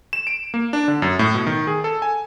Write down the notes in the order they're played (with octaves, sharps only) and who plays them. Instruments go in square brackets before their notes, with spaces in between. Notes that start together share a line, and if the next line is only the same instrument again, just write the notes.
[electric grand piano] E7
D7
A#3
D4
D3
F#2
A2
B2
D#3
G#4
A4
G#5